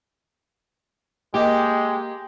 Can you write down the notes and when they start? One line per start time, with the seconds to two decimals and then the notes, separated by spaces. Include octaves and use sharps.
1.34 G#3 A#3 G4 D#5